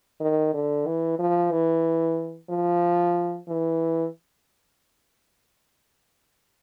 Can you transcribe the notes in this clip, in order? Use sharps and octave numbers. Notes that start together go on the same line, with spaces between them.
D#3
D3
E3
F3
E3
F3
E3